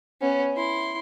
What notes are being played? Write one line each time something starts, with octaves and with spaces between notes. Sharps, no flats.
B3 C#4
E4 C6